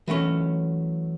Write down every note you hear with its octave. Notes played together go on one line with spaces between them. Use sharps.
E3 F#3 A3 C#4